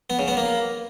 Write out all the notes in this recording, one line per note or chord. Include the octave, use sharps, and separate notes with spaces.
B3
C#3
B3
A#3